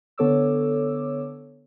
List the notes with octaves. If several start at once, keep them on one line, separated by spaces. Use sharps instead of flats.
D3 B3 A4 C#5 D6 E6